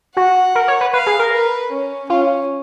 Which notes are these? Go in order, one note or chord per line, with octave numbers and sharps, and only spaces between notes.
F#4 F#5
A#4
C#5
B4
B4 F5
G#4
A#4
B4
C#4
C#4 F4